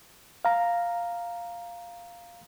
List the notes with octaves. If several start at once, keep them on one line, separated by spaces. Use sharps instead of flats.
F5 A#5